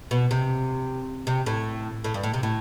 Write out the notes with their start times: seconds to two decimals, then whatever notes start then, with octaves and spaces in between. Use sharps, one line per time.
0.11 B2
0.31 C3
1.27 C3
1.46 A2
2.04 A2
2.14 G2
2.23 A2
2.34 C3
2.43 A2